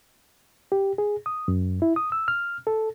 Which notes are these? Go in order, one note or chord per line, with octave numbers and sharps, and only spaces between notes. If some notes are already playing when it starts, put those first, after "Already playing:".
G4
G#4
D#6
F#2
E4
D#6
E6
F6
A4